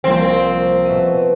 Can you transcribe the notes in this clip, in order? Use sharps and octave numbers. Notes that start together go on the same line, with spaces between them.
C2 F3 A#3 C4
B2 E5 D#7